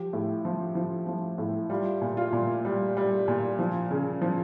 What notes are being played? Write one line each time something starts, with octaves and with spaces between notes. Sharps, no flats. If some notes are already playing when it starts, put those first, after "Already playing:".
Already playing: F3 G4
A2
F3
F3
F3
A2
G3 F4
A#2
F4
A#2
G3
G3
A#2
F3
C#3
F3